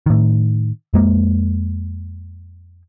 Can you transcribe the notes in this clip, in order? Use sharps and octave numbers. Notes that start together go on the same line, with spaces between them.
A2 D#3
F2 G#3 A#3